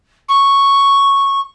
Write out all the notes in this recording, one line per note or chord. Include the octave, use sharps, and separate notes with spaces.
C#6